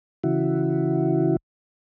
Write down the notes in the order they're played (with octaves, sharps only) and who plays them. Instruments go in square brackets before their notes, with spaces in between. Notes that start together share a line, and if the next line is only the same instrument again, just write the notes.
[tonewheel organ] C#3 E3 E4 F#4